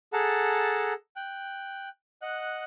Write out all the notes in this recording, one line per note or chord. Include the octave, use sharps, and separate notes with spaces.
G#4 A4 F#5 A5 A#5
G5 F#6
D#5 F#5 F#6